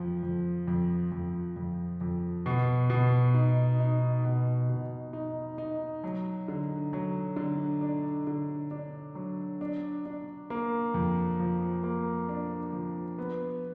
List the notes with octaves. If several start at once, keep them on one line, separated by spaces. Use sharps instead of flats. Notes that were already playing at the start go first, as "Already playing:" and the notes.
Already playing: F2 F3
F2
F2
F2
F2
F2
B2
B2
D#4
D#4
B2
B2
D#4
D#4
F#3
D3
F#3
D3
D4
D3
D4
F#3
D4
D4
A#3
F2
F3
A#3
D4
F3
B3